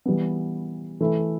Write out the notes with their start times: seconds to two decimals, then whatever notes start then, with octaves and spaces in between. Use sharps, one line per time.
0.06 E3 G3 B3
1.01 E3 A3 E4